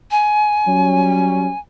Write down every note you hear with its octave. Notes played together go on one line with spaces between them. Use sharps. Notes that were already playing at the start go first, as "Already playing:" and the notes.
G#5
F#3 G3 C#4